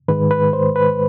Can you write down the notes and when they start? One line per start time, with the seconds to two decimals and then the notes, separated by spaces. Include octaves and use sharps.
0.08 G#2 D#3 G#3 B4
0.31 B4
0.53 C5
0.76 B4